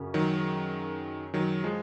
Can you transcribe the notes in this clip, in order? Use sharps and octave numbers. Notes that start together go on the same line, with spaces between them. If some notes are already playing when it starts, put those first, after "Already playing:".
Already playing: F#2 C#3 C#4
D#3 F#3
D#3 F#3
F3 G#3